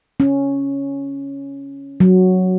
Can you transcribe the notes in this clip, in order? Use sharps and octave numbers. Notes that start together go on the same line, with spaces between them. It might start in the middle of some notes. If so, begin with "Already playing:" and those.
C#4
F#3